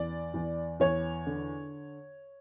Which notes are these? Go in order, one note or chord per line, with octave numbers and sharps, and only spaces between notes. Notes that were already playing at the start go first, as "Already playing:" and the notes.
Already playing: E2 D5
E2
E2 C#5
D3